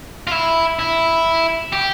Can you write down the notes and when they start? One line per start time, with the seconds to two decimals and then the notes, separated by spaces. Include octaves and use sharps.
0.27 F4
0.31 E4
0.79 E4
1.73 G4